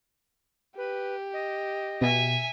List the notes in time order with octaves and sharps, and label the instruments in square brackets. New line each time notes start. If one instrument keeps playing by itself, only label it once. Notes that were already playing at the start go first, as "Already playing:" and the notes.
[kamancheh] G4 [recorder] B4
[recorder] D#5
[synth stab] B2 [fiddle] E5 G#5